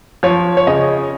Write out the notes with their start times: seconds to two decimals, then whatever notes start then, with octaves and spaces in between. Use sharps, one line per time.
0.23 F3 C#5
0.57 C#5
0.67 C#3 D#5